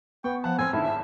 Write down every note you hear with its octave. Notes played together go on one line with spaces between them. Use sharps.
B3 G5 C#6
F3 F5 F#5 G#5 A5
A2 C4 G#5 E6 F6
A2 D3 D#3 D#4 E4 A5
G#1 G#2 E5